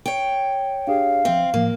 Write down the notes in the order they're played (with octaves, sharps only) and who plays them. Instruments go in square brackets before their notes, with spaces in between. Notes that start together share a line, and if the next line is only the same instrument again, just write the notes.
[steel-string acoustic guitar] C#5 G5
[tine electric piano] D4 G4 G#4 [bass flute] F5
[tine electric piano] F3 E5 [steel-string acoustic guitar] C4
[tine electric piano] A2 F3 [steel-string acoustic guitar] A#3